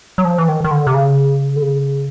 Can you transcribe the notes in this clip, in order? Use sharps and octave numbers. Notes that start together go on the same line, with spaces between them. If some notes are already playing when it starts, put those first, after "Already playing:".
F#3
F3
E3
D#3
D#3
D3
C3
C#3
D3
C#3